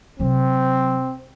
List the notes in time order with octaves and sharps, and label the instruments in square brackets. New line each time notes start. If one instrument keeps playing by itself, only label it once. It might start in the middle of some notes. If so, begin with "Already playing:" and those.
[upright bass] C3 F#3 [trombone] C4